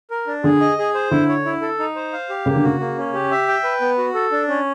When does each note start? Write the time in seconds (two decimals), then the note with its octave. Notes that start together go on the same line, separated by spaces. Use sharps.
0.11 A#4
0.27 D4
0.44 D3 G#4
0.61 D#5
0.78 G#4
0.95 C5
1.11 D3 E4
1.29 C#5
1.45 E4
1.62 A4
1.79 D#4
1.96 C5
2.13 F5
2.29 G4
2.46 C#3 A#3
2.56 D3
2.63 C#3 F#4
2.80 A#3
2.98 C#4
3.14 G4
3.31 E5
3.48 G5
3.64 B4
3.81 B3
3.98 F#4
4.14 A4
4.32 D4
4.48 C#4